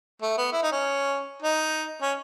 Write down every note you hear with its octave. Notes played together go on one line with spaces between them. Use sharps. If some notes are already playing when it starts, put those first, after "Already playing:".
A3
B3
E4
D#4
C#4
D#4
C#4